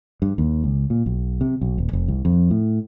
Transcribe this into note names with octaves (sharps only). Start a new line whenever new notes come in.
G2
D#2
C#2
A#2
B1
C3
B1
D#1
F1
C2
F2
A2